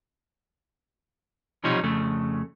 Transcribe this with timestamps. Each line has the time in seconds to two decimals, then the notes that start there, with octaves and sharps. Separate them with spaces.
1.64 B1 C3 F3 G3 D#4 C#5
1.83 F2 C#3 A3